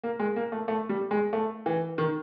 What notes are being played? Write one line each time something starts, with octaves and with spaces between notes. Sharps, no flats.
A#3
G#3
A#3
A3
A3
G3
G#3
A3
E3
D#3